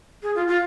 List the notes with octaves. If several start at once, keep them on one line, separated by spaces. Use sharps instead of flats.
G#4
F4
F4